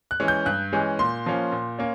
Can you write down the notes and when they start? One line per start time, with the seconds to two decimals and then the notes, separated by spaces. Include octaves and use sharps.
0.11 F#6
0.20 E3 G#3 C#4
0.28 G6
0.46 G2 F#6
0.73 E3 G#3 C#4
0.99 A#2 C6
1.26 F3 A#3 C#4
1.52 A#2
1.79 A#3 C#4